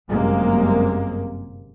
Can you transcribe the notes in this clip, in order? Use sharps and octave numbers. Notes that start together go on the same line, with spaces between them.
G1 F#2 C3 G#3 A#3